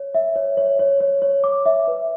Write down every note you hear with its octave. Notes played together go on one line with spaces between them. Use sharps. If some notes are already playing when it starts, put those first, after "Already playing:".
Already playing: C#5
E5
C#5
C#5
C#5
C#5
C#5
D6
E5
B4